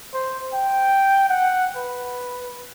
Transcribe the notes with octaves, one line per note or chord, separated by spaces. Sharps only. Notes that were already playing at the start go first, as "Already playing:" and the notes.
C5
G5
F#5
B4